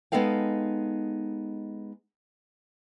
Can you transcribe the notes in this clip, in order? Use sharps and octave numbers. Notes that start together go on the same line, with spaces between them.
G#3 B3 D#4 A4 F5 G5